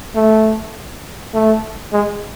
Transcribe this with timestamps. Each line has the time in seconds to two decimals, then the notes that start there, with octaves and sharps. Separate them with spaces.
0.16 A3
1.34 A3
1.93 G#3